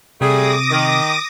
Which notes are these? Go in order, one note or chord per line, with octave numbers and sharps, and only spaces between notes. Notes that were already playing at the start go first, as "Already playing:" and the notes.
C3 G3 A3 G#4 D6 D#6 A#6
D#3